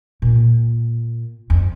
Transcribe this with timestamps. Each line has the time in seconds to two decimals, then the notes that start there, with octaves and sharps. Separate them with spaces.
0.22 A#2
1.50 F2